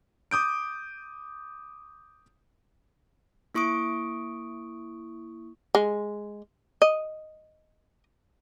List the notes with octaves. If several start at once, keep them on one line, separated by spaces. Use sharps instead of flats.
D6 D#6 G6 D7
A#3 E4 C#6 D#6 D7
G#3
D#5